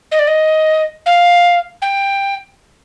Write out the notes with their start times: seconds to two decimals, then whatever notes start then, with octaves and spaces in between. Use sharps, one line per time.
0.12 D#5
0.19 D5
0.27 D#5
1.06 F5
1.82 G5